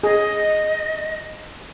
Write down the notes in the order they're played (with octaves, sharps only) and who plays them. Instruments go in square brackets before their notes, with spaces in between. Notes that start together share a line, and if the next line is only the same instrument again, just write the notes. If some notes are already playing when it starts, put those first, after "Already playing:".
[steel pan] G#4 [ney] D#5